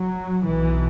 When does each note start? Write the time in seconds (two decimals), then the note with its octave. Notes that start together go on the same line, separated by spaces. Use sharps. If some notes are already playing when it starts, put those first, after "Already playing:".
Already playing: F#3
0.45 B1 B2 E3